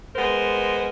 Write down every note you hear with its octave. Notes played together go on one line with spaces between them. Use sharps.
G#3 B3 A#4 C5